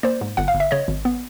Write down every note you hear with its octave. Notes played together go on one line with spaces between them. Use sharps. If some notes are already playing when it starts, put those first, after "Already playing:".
A#3 C5 D5
G#2
G1 F#5
F5
G1
E5
C#3 C#5 D#5
G#1
B3